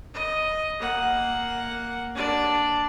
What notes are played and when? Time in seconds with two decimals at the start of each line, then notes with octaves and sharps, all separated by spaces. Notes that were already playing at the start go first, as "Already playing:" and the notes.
0.14 D#5
0.79 A#3 F#5
2.14 D4 D5